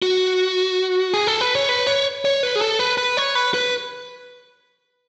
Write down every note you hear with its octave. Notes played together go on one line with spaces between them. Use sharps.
F#4
G#4
A4
B4
C#5
B4
C#5
C#5
B4
G#4
A4
B4
B4
C#5
B4
B4